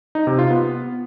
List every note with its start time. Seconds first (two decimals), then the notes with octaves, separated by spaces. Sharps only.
0.15 D#4
0.27 C3
0.39 F4
0.50 B3